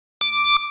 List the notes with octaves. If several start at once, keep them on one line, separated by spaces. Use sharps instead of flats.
D6